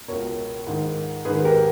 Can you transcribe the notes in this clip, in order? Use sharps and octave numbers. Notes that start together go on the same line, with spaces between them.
C#2 B2 A#4 C#5
G#2 D#3
G#2 D#3 G#4 B4
G4 A#4